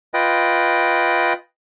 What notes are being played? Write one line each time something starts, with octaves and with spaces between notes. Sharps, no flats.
F4 B4 D#5 G5